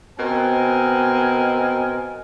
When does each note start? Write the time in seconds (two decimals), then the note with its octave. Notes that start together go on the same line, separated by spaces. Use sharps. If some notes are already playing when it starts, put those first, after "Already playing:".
0.18 B2 C4 A#4 D#5 G#5